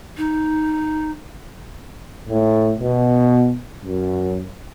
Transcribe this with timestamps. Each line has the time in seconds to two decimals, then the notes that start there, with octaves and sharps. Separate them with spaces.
0.17 D#4
2.29 A2
2.80 B2
3.85 F#2